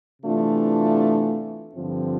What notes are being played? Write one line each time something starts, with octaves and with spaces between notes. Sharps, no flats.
C3 E3 A3 D4 F4
G2 D3 F3 C4 F4